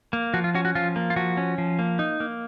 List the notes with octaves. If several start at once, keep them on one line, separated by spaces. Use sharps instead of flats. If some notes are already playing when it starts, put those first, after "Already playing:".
A#3
F3 F#4
F4
C#4 F#4
F#4
F3 F4
A#3
F4
F3 F#4
C#4
F3
A#3
D#4
A#3